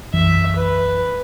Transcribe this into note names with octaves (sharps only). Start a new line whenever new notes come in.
B1 F#2 E3 E5
B4